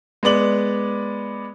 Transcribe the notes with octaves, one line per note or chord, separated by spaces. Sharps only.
G#3 B3 D5 F#7